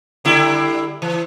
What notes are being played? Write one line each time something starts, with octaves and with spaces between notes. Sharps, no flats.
D3 G3 E4
E3